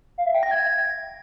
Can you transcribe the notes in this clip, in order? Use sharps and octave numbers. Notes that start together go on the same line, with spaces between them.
F5
E5
G5
A#6
G#6